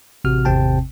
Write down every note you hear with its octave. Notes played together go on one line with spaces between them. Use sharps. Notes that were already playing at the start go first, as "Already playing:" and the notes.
A1 C3 F#4 F6
G#1 E2 C3 C4 G5 A5